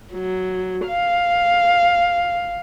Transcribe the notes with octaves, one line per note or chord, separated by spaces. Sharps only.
F#3
F5